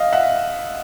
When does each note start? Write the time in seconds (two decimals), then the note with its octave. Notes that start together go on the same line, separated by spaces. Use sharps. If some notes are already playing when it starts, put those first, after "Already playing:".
Already playing: D#5 F5
0.12 E5 F#5